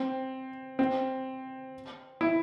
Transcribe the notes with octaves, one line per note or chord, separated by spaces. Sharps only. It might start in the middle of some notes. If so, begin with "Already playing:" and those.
Already playing: C4
C4
E4